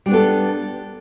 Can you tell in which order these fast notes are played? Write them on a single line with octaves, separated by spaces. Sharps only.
G3 D4 B3 A4